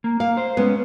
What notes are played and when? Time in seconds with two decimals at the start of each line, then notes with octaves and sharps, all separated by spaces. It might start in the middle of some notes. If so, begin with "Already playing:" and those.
0.04 A#3
0.20 A#3 F5
0.37 C5
0.57 G#3 B3 C#4